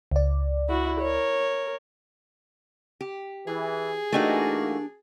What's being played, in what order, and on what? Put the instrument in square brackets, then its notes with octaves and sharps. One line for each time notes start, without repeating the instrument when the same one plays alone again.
[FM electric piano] C#2 D5
[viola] E4 F#4
A#4 C#5
[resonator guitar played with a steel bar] G4
[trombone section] E3 [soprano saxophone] G#4
[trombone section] E3 A#3 [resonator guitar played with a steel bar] A3 D#4 F#4 [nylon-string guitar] D4 G4 G#5